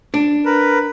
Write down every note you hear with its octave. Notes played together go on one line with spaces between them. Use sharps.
D4
A#4 B4